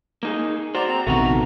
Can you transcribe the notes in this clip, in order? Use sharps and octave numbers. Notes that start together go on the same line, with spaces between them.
A#3 D#4 G#4
F#4 C5 D5 A#5
C4 A#5
A#1 C3 D#3 A3 B3 F#4 A#5